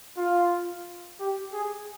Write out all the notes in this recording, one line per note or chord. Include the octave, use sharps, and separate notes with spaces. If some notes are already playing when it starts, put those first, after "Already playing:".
F4
G4
G#4